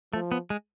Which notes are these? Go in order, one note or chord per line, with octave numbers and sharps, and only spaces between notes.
F3 A3
B3
G#3